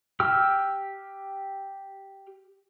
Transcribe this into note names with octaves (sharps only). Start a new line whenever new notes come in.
G4 G5 E6 F6